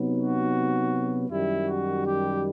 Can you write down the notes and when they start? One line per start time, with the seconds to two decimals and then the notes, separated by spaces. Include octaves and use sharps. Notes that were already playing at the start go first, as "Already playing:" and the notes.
Already playing: C3 F#3 B3 D#4
0.17 F#4
1.30 F#2 D#3 G3 E4
1.68 F#4
2.05 G4